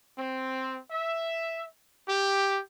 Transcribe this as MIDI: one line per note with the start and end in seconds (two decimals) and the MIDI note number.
0.17 0.78 60
0.91 1.65 76
2.07 2.61 67